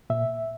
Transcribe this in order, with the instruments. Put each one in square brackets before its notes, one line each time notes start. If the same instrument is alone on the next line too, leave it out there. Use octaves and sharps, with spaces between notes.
[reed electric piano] A#2 E5